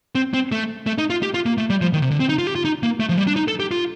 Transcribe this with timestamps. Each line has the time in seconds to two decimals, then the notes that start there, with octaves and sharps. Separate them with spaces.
0.15 C4
0.34 C4
0.52 A3
0.87 A3
0.98 D#4
1.10 F4
1.23 G4
1.34 F4
1.46 A#3
1.58 A3
1.70 G3
1.81 F3
1.93 D#3
2.02 C3
2.11 D3
2.20 C4
2.29 D#4
2.38 F4
2.47 G4
2.55 F4
2.65 D#4
2.83 A#3
3.00 A3
3.09 F3
3.18 G3
3.27 D4
3.36 D#4
3.48 A4
3.60 G4
3.71 F4